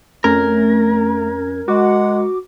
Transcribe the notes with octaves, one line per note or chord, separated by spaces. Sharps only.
F2 A3 C#4 A#4 G#6
G#3 F#4 F#5 D6